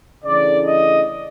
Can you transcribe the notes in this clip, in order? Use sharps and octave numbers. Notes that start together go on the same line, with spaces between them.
C#3 E3 A3 D4 D5
D#5